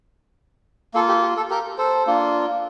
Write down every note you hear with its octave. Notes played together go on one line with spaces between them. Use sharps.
A#3 F4 A4
G4
G4
A4
G4 A#4
A4 C5
A#3 D4 F4